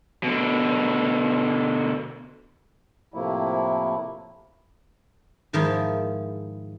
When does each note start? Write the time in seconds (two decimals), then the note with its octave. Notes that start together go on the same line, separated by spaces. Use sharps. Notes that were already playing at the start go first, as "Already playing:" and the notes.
0.23 B2 D3
3.14 A2 C3 F3 A3 A#3 E4
5.53 G#2 D#3 F3 G#3 D#4 E4